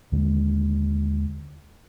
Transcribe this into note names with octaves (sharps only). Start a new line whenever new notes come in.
D#2 D3 G#3